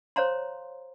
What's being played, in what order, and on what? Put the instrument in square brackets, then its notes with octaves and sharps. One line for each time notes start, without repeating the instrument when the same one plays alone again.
[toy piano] C5 C#5 F5 A#5 C6